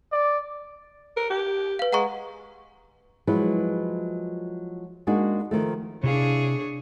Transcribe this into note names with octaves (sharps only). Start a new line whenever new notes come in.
D5
A#4
G4
B4 F5
G#3 F#5 A#5 C#6
F3 F#3 G#3 E4 B4
G#3 A#3 D4 D#4 F#4 G#4
D#3 F3 A3
C3 D4 E4 G#4 C#5 F5